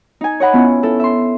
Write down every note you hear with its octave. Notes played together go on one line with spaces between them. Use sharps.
D#4 G#5
C#5 D#5 F#5 B5
B3 C#4 E4 F4
E4 A4
E5 C6